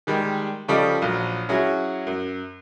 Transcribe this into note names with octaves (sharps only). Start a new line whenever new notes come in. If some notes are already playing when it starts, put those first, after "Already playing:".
D#3 G3 G#3
C#3 F3 G3 A4 D5 D#5
A#1 F#3
F#3 C#4 E4 F#4 G#4
F#2